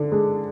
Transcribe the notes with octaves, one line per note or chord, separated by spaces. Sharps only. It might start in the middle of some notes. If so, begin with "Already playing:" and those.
Already playing: D3 D4
G#3